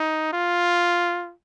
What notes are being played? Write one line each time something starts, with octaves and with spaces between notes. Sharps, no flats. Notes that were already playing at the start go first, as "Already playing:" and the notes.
Already playing: D#4
F4